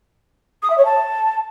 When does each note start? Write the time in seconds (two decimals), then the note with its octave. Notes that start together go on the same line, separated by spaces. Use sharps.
0.63 D#6
0.70 E5
0.78 C#5
0.85 A5